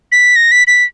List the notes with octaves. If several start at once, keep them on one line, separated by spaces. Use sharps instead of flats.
B6
A#6
B6
B6